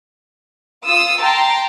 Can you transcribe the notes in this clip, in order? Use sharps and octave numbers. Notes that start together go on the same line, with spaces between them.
F4 D#6 E6
G5 A5 A#5 C6